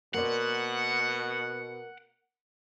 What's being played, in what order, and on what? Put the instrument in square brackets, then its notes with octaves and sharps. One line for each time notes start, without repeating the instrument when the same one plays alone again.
[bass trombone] B2 [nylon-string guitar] A#3 C5 D5 [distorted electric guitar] F#5